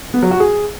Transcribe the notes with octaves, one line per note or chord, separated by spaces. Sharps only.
B3
F#3
F#4
G#4